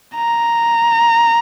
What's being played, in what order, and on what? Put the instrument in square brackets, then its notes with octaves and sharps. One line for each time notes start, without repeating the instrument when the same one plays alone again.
[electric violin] A#5